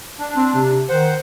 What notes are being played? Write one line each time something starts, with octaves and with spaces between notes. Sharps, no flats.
D4
C4
C3
D#3 C5 F#5